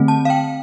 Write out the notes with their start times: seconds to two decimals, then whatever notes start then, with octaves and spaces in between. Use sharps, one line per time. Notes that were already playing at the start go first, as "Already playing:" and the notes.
Already playing: D3 A3 C4
0.08 A5
0.25 F5
0.30 G5